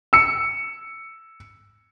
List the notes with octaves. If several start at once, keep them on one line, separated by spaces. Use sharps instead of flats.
E6 C#7